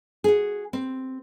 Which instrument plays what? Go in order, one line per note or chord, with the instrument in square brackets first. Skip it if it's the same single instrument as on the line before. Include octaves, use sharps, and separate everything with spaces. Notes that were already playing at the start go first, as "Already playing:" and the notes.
[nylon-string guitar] F#4 G#4
C4